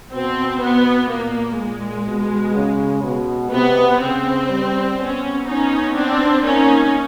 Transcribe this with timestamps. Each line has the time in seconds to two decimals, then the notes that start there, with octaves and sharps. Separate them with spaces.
0.12 B2 C4
0.61 B2 B3
1.10 A#2 A#3
1.58 A#2 G#3
2.07 B2
2.55 C#3
3.03 B2
3.52 C3 B3
4.01 C#3 C4
4.49 G3
4.98 B3 C#4
5.46 C#4 D#4
5.95 C4 D4
6.43 A#3 C#4 D#4